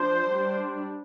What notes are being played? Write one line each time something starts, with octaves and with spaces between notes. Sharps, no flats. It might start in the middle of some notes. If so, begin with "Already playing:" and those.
Already playing: F3 D4 C5
G3 D4